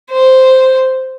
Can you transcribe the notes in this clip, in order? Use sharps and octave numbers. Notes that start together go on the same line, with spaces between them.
C5